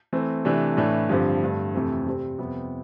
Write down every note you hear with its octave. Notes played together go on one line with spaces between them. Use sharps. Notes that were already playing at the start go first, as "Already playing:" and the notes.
E3 A3 C4
C3 E3 A3 D4
A2 E3 A3 D4
G2 D3 F3 C4 G4
G2 D3 A3
F2 C3 E3 A3 C4
C3 G3 C4
F2 C3 G3 B3